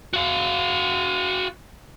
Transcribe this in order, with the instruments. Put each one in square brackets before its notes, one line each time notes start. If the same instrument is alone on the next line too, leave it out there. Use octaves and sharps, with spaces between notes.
[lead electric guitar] F#4 F5